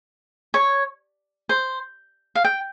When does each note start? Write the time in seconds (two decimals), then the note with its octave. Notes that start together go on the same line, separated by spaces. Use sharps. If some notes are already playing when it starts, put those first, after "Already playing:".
0.54 C#5
1.49 C5
2.35 F5
2.44 G5